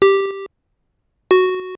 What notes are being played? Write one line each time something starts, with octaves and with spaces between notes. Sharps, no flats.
G4
F#4